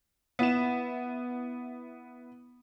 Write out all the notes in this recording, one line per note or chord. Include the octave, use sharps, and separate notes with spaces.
B3 E4 E7